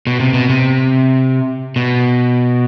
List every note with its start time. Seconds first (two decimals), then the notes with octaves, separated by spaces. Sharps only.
0.07 B2
0.20 C3
0.34 B2
0.50 C3
1.76 B2